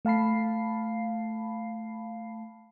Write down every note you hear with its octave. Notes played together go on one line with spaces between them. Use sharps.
A3 F5 A5 B5 C7